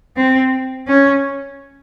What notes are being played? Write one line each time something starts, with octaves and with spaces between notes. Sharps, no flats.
C4
C#4